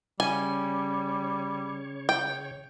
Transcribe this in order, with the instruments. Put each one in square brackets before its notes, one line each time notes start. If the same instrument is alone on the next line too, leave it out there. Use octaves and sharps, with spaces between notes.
[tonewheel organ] C#3 C#5 [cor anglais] G3 [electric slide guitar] C#4 [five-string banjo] G#5
[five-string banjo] G5